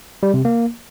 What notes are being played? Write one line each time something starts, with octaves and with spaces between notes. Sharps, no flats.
G3
C3
A#3